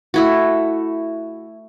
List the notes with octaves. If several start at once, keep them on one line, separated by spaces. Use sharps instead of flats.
A3 E4 F#4